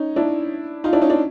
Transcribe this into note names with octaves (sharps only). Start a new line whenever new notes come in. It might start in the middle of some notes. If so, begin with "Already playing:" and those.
Already playing: C#4 D#4
D4 E4
D#4 F4
D4 E4
C#4 D#4
D4